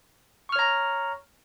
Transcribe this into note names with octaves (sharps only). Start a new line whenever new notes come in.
C#5 A#5 C#6 F6